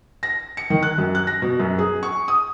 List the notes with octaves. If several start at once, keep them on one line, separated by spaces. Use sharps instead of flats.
A#6
C#7
D#3
F#6
F#2
F#6
A#6
B2
F#2
G#4
C#6
D#6